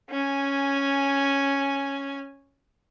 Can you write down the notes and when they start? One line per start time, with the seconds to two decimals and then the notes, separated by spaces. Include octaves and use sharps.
0.10 C#4 G#5